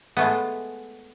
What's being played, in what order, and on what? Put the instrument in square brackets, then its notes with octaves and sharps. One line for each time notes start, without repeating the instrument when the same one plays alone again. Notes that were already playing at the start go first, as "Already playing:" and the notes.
[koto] G#3 A3 B3